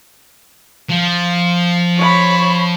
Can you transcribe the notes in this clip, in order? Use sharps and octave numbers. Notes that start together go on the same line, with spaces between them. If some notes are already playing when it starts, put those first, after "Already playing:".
F3
C#5 B5